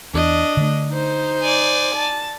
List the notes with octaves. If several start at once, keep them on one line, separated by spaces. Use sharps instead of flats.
E2 D4 D#5
D3 A3
D#4 C5
D5 G#5
A5